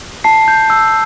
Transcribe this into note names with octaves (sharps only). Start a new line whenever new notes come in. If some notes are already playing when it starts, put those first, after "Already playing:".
A5 C7
G6
E6